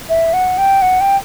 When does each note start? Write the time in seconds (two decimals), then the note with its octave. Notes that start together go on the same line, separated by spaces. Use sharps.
0.09 E5
0.33 F#5
0.58 G5
0.82 F#5
1.01 G5